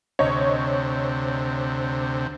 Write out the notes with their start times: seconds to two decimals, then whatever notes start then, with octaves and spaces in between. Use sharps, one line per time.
0.19 D2 C3 C#5 D#5